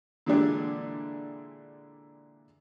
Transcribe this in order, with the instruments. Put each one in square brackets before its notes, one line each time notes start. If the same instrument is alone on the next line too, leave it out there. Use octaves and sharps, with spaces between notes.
[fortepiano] A#2 D3 E3 G#3 D4 G4